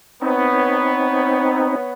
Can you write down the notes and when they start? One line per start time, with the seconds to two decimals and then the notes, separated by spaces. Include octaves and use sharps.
0.22 B3 C4 D#4 C#5